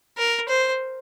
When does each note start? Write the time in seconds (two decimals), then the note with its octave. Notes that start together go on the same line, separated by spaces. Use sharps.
0.18 A#4
0.48 C5